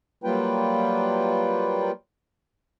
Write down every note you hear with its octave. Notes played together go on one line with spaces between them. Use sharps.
F#3 G3 A#3 F4 B4 G5